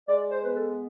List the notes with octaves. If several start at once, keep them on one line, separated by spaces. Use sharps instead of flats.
G#3 D5
C5
B3 B4
A4